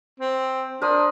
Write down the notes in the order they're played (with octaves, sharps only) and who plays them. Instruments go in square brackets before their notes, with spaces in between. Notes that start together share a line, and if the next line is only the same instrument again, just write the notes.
[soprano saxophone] C4
[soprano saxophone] D4 [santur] A#4 C5 D#6